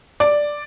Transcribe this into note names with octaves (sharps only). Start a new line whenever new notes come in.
D5